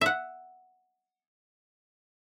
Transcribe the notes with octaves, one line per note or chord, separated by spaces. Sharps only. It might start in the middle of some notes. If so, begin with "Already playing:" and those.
E5 F#5